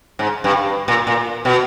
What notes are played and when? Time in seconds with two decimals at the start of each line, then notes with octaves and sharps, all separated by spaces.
0.19 G#2
0.44 G2
0.88 A#2
1.07 A#2
1.45 B2